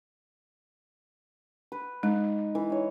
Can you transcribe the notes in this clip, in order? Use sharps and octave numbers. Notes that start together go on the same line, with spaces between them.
B4
G#3 D#4
E3
D#4 C#5